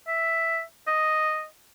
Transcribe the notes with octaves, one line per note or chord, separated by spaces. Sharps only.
E5
D#5